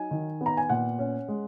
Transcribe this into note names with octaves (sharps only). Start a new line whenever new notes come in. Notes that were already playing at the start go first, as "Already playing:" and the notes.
Already playing: F#3 D#4 G#5
D#3
B3
A#5
G#5
A#2 F#5
C#4
G#3